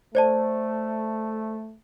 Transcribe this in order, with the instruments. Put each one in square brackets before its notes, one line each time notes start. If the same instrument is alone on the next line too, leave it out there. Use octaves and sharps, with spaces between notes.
[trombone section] A3 [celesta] C5 D5 A5